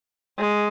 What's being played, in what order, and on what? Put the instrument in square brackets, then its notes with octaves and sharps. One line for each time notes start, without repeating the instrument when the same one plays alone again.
[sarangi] G#3